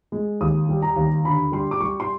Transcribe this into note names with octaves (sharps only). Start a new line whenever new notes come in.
G#3
D#2 D#6
G3
A#5
D#2
D3 B5
G3 C6
D6
G3 C#6
C6